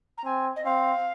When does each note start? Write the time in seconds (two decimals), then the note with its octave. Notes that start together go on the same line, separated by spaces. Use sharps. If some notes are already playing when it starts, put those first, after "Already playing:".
0.18 A#5
0.25 C4 G#5
0.56 D#5
0.65 C4 F5